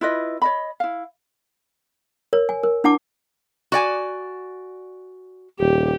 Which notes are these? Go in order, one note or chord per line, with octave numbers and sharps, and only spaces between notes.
E4 F4 B4 D#5
C#5 D#5 B5
E4 F5
A#4 C#5
G#5
A#4
D4 E4 F#5 A5 D6
F#4 D5 G#5
D#1 G4